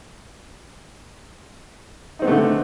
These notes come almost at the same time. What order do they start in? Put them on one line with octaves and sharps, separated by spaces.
D#4 C4 B3 A3 D3